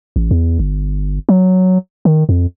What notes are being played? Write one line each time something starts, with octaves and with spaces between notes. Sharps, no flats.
A1
E2
G1
F#3
D#3
F2